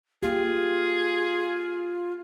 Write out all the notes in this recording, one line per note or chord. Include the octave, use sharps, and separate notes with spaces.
A#3 F4 G4 G#4